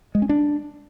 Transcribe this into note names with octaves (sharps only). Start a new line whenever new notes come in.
G#3
C#4
D4